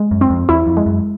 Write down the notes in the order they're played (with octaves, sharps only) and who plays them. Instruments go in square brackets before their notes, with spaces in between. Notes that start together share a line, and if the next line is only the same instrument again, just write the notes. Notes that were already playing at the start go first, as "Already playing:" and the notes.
Already playing: [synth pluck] G#3
[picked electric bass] F#2
[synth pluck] C4
[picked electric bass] F2
[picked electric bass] E2 [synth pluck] E4
[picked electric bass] F2
[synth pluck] G#3
[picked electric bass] F#2